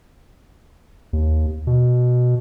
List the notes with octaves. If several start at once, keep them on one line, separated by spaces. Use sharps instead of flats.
D#2
B2